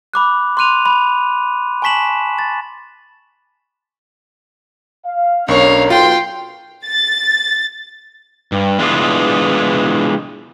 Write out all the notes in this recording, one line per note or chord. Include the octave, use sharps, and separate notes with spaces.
B5 D6 F#6
C6 D6 F#6 D#7 F7
B5
G#5 A5 C#6 B6 E7 F#7
A6
F5
B1 C#4 D4 A#4 C#5 F5 C#6
B1 F4 G5 C6
A6
G2
E3 G#3 B3 D4 E4 F4